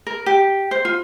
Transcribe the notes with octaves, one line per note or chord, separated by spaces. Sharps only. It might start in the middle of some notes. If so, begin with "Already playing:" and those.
A#4
G4
C5
F4